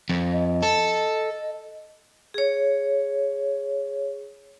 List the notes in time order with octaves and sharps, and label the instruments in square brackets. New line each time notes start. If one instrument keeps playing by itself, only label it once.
[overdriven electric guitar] F2
[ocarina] D#5
[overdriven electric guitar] A4
[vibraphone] G#4 C#5